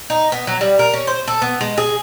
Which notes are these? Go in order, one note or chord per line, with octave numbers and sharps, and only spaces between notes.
D#4
B3
F#3
G3
A#4
C#4
C5
A4
B3
G#3
G#4